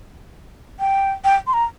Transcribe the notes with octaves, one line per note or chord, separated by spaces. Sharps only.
G5
G5
C6
A#5